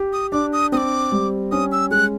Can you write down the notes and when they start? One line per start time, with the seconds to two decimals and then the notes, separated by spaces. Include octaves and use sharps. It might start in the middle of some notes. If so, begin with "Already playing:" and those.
Already playing: G4
0.13 D#6
0.32 D4 D6
0.53 D#6
0.72 C4 D#6
0.77 D6
1.12 G3
1.51 C#4 D#6
1.72 E6
1.91 G#3 F#6